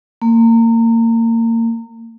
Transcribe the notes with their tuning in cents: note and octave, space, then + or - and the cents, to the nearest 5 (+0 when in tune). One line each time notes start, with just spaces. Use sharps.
A#3 -30